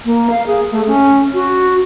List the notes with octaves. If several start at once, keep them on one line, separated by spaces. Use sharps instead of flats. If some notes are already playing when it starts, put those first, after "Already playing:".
A#3
F5
G#4
A3
C#4
F#4